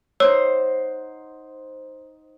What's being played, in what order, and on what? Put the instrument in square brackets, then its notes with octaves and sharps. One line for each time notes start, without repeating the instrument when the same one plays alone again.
[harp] D#4 C5 F#5 [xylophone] C#5 E6